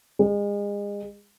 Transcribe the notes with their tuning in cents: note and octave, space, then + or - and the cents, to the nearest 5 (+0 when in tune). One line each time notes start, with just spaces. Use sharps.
G#3 -35